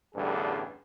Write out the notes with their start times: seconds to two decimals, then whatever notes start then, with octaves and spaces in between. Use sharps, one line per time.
0.15 A1 E2 G2 D3 G3 G#4